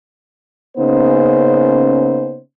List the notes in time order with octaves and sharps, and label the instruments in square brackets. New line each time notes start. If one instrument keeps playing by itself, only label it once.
[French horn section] C#3 A#3 B3 C#4 D#4 C5